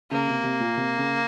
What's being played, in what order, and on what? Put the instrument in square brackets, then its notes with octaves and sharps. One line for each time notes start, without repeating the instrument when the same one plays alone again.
[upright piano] C#3 [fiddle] A#3
[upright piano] C3
C3
A#2
C3
C#3